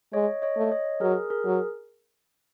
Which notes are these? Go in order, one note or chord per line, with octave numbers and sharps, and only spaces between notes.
G#3 C#5 D#5
C#5 D#5
A3
C#5 D#5
F#3 G#4 A#4
G#4 A#4
F#3